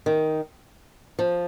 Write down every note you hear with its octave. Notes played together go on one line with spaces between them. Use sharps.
D#3
F3